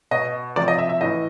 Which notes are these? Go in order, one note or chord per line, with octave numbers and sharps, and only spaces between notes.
B2 D#5
C3 F3 D5
D#5
E5
E5
A2 E3 D#5